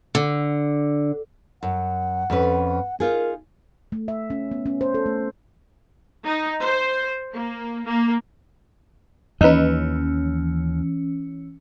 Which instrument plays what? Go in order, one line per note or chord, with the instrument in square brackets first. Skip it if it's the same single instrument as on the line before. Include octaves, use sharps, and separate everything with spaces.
[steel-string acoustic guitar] D3
[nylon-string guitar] F#2 [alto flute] F#5
[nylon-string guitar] F2 C#4 B4
[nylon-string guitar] D#4 F4 G#4 [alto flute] A#4
[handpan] A3
E5
C#4
B3
C#4
C5
A4
A3
[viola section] D#4
C5
A#3
A#3
[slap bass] D#2 [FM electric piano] E3 C#4 [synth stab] D#4 B4